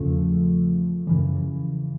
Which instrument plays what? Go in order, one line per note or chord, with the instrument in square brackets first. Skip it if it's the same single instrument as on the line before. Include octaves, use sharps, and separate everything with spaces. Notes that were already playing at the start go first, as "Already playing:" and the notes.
Already playing: [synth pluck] E2 C#3 F3 A3
F#2 C#3 E3